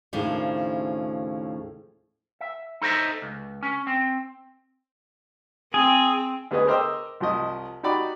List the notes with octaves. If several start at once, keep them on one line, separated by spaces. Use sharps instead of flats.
D#2 A2 C#3 F3 D4
E5
D#4 A4 C5 D#5 E5
C#2
C#4
C4
C4 G#4
D2 B3 G#4 B4 D#5
A#4 C5 D#5 G5 D6 E6
C2 F3 D#5
D#4 F#4 G4 D5 B5